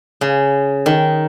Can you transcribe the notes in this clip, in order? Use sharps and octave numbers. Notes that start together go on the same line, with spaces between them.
C#3
D#3